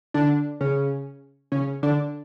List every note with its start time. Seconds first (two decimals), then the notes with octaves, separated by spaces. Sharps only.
0.14 D3 D4
0.61 C#3 C#4
1.52 C#3 C#4
1.83 D3 D4